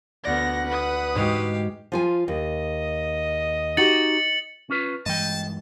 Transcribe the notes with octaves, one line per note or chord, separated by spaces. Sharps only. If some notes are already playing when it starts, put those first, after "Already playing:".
D2 B3 D5 F#5 A#6
B4 D#6
G#2 G#3 F#4 G4 F5
F3 F4 G#5
D#2 D#5
D#4 F#4 G4 A6 C#7 F#7
C#4 F4 B4
G2 E3 G#3 D#5 G5 A5